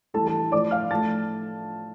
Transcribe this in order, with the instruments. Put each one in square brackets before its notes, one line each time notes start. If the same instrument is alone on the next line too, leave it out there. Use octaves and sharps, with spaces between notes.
[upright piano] A2 E3 G3 A4 A5
A4 A5
A2 F3 A3 D5 D6
F5 F6
A2 F3 A3 A5 A6